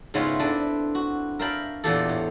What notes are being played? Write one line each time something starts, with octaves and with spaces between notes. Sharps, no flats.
G#2 C#3 G#3 B3 E4 F4
C4 D4 E4 A4 B4
F#4
A#4 E5 F5 G5 A5 B5
E2 A#2 E3 A#3 G4 A4
A2